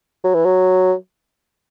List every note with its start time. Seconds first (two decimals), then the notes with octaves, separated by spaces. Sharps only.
0.24 F#3
0.35 E3
0.45 F#3